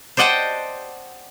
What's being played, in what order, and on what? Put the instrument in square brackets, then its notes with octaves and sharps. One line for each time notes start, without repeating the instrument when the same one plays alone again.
[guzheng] C5 D5 D#5 F#5 G5 A5